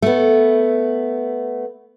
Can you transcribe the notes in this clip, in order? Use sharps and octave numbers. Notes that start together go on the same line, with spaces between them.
A3 B3